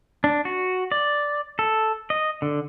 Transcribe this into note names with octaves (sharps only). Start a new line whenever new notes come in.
D4
F#4
D5
A4
D#5
D3